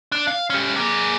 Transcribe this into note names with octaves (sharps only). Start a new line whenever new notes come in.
D4
F5
C#4 G4
A#3 G#4